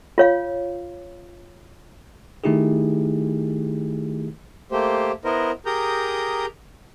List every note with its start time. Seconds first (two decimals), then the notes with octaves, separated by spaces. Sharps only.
0.18 F4 C#5 F5
2.44 D#3 A3 D#4 E4 G4 G#4
4.70 A3 A#3 G4 C5
5.25 B3 E4 A#4 C5 D#5
5.66 G4 G#4 A#4 A#5 D#6 G6